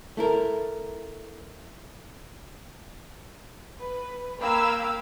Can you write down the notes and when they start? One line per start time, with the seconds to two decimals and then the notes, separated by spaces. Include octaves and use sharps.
0.17 A3 E4 A#4
3.80 B4
4.39 A#3 F5 G5 B5 E6 G#6